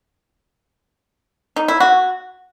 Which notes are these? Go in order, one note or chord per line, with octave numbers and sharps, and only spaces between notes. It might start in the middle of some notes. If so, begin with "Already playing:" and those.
D#4
E4
F#4